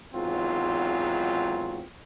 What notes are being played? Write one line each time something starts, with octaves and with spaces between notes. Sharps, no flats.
G#1 E2 G#2 F#3 C4 F4